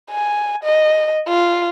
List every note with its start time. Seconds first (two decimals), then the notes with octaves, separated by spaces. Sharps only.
0.11 G#5
0.64 D#5
1.28 F4